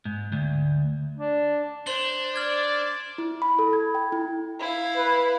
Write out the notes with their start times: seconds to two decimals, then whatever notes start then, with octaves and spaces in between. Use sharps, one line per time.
0.05 G#2
0.32 D2
1.18 D4
1.87 D4 C5 C6 F#7 G7
2.36 D5 F6 G#6
3.18 E4
3.42 B5
3.59 A4
3.73 G#6
3.95 G5
4.12 E4
4.59 E4 F5
4.96 B4